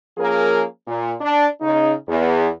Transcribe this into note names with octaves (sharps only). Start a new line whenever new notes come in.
F3 A#3 C#4 G#4 A#4
A#2
D4
C#3 D#4
E2